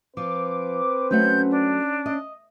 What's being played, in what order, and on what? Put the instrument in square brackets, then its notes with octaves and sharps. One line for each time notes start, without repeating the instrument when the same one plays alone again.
[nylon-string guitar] F3 [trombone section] C4 B4 C5 [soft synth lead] D6
[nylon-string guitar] F#3 A3 F#5 [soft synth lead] C#4 [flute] G6
[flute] D4
[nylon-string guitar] D#5